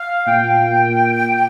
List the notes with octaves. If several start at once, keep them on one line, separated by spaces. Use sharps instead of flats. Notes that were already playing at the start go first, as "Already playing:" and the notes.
Already playing: F5
A#2 G5